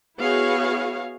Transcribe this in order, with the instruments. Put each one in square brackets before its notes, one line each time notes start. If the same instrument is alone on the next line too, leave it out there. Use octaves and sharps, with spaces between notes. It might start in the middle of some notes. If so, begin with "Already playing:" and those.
[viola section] B3 E4 F#4 G#4 C#5 F5